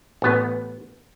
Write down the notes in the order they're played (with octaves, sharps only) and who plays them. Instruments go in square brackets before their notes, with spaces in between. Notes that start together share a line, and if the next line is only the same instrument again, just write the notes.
[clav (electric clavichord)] A1 B3